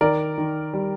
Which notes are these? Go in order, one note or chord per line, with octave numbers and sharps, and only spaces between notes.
D#3 A#4 D5
D#3
G3